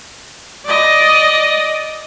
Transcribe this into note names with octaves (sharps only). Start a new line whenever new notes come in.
D5 D#5